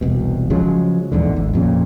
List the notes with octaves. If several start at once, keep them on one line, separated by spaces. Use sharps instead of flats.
E1 C2 B2
C#3 F3 F#3 G#3
A#1 E2 G#2 D3
G#1
F2 A#2 C#3